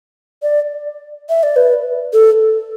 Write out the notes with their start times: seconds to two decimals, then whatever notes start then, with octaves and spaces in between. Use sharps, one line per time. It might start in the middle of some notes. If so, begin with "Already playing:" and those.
0.43 D5
1.29 E5
1.43 D5
1.56 B4
2.13 A4